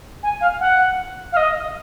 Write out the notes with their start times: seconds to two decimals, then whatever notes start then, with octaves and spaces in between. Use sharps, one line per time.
0.23 G#5
0.41 F5
0.60 F#5
1.32 F5
1.37 D#5